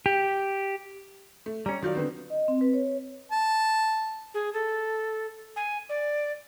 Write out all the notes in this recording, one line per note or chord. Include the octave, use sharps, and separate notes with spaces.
G4
A3
G3 C#4 A#5
D#3 F#3 F4 D5 G6
D3 B3 C4
D#5
C4
B4
C#5
A5
G#4
A4
G#5
D5